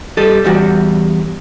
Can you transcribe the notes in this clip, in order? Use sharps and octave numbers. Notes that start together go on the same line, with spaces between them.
G3 A4 D#5
E2 G3 F#4